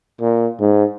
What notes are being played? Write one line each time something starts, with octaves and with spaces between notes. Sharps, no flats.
A#2
G#2